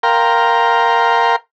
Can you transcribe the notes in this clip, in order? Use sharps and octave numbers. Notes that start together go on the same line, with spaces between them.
A#4 F5 G5 A#5 C6